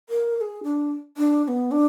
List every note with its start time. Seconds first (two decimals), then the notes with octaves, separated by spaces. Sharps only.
0.09 A#4
0.37 A#4
0.41 G#4
0.64 D4
1.17 D4
1.44 D4
1.48 B3
1.71 D4